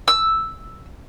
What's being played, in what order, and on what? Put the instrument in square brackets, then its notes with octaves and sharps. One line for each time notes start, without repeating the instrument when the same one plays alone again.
[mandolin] E6